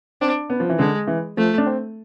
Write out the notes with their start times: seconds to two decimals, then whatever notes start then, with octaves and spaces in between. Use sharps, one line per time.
0.21 C4 D4
0.50 B3
0.60 F3
0.69 E3
0.79 D3 G#3
1.07 E3
1.37 F3 A3
1.58 D4
1.66 C4